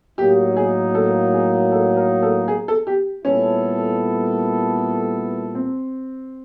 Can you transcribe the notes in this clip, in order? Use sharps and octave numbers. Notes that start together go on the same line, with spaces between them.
A2 F#3 A#3 D#4 G4
G#4
A4
G#4
A4
A#4
A4
G#4
A4
G4
A#2 G3 B3 C#4 E4 A4
C4